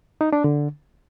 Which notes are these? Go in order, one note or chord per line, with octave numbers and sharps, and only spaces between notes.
D#4
D4
D3